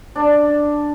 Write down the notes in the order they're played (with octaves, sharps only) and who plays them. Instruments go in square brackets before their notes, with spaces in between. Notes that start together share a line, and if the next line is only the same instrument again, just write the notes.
[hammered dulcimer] D4